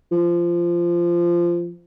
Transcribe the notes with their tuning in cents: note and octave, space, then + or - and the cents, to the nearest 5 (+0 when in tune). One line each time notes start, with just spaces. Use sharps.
F3 -15